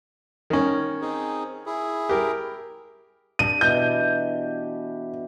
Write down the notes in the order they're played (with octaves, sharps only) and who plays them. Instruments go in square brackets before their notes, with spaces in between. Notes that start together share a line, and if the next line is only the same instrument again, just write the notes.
[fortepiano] D#3 C#4
[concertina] C4 D#4 G#4
E4 G#4
[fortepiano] G4 A#4
[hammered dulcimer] D4 G4 [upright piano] D#7
[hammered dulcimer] B2 E3 [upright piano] G6